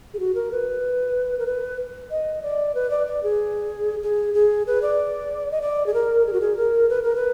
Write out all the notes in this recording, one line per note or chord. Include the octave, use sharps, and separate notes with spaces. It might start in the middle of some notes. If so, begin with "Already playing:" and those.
G#4
F#4
A#4
B4
A#4
B4
D#5
D5
B4
D5
D5
G#4
G#4
G#4
B4
D5
D#5
D5
G#4
A#4
G#4
F#4
G#4
A#4
B4
A#4
B4